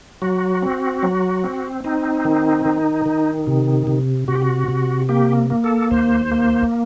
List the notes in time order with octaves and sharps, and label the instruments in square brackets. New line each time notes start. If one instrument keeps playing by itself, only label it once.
[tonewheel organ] F#3 F#4
C4
F#3
C4
C4 D#4
D#3
D#3
D#3
C3
C3
C3 F#4
G4
F#4
C3
A#3 G4
A#3
A4
D#2 C5
A#3